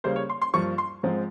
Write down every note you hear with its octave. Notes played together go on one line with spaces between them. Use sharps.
C#3 G3 A#3 C5
C#5
C6
C6
G2 F3 A#3 C#6
C6
G#2 F3 G#3 C4